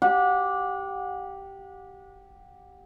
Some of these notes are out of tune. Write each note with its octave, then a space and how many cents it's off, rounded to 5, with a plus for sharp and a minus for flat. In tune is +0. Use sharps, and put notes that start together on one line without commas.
G4 -5 F#5 -30